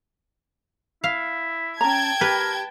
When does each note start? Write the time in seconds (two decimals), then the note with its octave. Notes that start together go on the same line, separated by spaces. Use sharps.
1.04 E4 F5
1.81 C#4 G5 A5 A#5 G#6
2.21 G4 A#4 B4